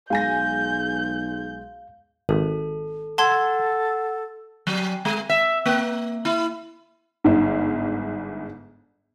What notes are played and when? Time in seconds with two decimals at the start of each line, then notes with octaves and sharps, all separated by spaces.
0.10 B1 G#3 F5 G#5 G6 A#6
2.29 G#1 A4
3.18 A4 F#5 A5 C6 G#6
4.67 F#3
5.05 G#3
5.30 E5
5.66 A#3
6.25 E4
7.24 G1 G#2